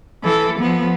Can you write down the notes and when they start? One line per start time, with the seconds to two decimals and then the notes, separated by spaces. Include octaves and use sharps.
0.24 E3 A4
0.59 F3 B3